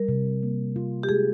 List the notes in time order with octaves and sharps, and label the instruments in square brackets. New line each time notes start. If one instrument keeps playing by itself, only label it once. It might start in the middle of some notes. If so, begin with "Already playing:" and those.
Already playing: [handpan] G3 [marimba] A#4
[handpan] C3
A#3
F4
[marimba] G4
[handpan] G#3 [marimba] G#4